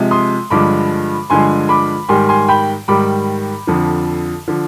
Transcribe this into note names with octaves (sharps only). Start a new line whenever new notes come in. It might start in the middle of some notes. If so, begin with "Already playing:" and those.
Already playing: C3 F3 G#3
C6 D#6
G2 D3 F3 G#3 B5 D6
G2 D3 F3 G#3 G#5 C6
B5 D6
G#2 D#3 G3 G#5 C6
G#5 C6
G5 B5
G#2 D#3 G3 B5 D6
F2 D3 F3
D3 F3